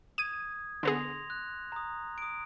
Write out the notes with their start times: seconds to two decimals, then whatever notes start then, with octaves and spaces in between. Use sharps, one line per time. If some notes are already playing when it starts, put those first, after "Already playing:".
0.18 D#6 G#6 D#7
0.83 D3 B3 G#4 C6 A#6 F7
1.30 F#6
1.72 A#5 D#6
2.18 D#6 D7